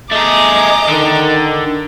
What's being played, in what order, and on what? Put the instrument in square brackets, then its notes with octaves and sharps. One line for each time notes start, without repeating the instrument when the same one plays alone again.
[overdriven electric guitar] A3 G#4 [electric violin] D#5 A#5 [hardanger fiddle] D6
[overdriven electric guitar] D3 [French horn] D#3